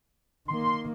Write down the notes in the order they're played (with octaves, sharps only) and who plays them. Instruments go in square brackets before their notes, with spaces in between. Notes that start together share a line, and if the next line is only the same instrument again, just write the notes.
[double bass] D#3 A#3 [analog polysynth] C6